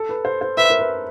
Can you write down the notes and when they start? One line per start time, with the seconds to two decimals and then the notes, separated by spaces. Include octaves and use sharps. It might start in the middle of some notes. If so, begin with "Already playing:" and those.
Already playing: A4
0.09 B4
0.25 C5
0.41 C5
0.57 B4 E5
0.70 A#4
0.79 B4